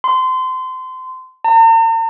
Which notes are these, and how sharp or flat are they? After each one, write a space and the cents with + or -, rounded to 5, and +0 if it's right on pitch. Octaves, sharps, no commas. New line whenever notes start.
C6 -25
A#5 -45